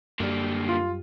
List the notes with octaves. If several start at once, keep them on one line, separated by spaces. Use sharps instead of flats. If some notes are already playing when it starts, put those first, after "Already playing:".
F#2 D3 G3 A#3
F4